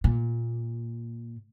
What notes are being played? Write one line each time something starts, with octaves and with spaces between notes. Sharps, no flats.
A#2